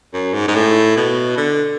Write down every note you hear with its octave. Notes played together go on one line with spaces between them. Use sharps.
F#2
G#2
G#2
A2
B2
D3